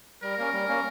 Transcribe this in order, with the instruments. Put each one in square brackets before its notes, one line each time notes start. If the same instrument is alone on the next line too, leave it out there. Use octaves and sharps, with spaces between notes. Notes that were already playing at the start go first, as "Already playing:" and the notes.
[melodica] G3 [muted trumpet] A#4
[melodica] A#3 C#4
G3
A#3 C#4